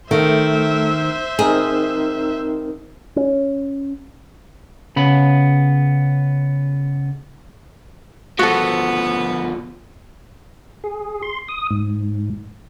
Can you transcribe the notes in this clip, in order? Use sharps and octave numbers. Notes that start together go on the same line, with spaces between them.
D#3 A3 C5 E5
C4 D#4 G#4 A#4
C#4
C#3 B3 B5
B2 F3 B3 F#4 A4
G#4
C6
D#6
G#2